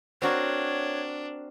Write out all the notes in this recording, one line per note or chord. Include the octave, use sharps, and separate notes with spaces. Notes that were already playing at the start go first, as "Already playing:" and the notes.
C4 D4 F#4 A#4 C#5